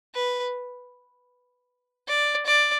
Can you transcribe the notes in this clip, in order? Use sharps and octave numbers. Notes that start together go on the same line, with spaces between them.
B4
D5
D5